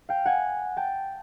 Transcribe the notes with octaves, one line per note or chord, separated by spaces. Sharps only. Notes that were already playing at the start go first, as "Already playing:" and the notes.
F5 G5
F#5 G#5
G5 A5